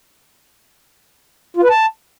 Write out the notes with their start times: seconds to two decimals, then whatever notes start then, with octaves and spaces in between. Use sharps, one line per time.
1.57 F4
1.63 B4
1.70 A5